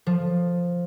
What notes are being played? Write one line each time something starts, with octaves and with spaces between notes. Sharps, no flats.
F3